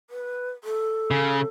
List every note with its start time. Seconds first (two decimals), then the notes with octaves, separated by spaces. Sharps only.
0.10 B4
0.64 A4
1.11 C#3